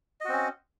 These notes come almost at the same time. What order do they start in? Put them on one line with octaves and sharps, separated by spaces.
D#5 F#4 C4 C#4